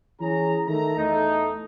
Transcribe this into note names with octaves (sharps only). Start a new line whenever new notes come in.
E3 C#4 G#4 A#5
D#3 A3 A#5
E2 A3 D#4